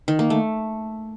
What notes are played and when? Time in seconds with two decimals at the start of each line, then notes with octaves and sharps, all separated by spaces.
0.08 D#3
0.19 A#3
0.30 A3